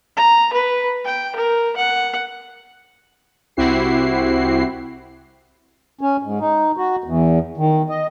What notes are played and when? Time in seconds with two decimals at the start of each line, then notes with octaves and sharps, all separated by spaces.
0.17 A#5
0.53 B4
1.05 G5
1.36 A#4
1.77 F#5
3.57 C2 C4 E4 F#4 G4 C7
6.01 C#4
6.23 G#2
6.40 D#4
6.77 F#4
7.04 E2
7.57 D#3
7.89 D#5